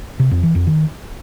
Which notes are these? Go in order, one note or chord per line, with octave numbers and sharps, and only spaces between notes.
C3
F2
E3
F2
D#3